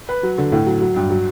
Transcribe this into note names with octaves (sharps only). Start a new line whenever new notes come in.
B4
F#3
D3
A2
F#3
F#3
G2
F#3